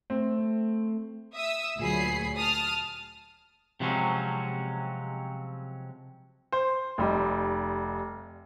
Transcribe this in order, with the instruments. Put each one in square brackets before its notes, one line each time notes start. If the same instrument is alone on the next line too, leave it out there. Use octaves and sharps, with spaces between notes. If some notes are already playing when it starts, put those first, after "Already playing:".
[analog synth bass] A3 [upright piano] C4
[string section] E5 D#6 E6
D2 A#2 F#3 G#4 B5 C7
A5 D#6 F6
[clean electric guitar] C3 F3 F#3 G#3 C4 C#4
[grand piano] C5
F1 G3 D#5